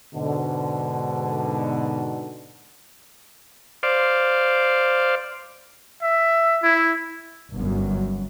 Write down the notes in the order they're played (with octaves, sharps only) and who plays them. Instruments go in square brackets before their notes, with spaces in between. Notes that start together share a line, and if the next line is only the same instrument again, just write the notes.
[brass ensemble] G#2 B2 D3
[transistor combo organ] C5 D5 F5
[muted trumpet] E5
E4
[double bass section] G1 F#2